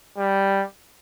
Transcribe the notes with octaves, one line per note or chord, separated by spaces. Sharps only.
G3